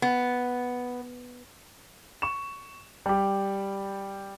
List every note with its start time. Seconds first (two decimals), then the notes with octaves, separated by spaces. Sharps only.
0.02 B3
2.22 C#6 E7
3.06 G3 G4